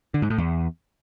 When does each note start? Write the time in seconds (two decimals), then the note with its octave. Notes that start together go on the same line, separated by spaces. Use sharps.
0.14 D3
0.22 G#2
0.30 A2
0.38 E2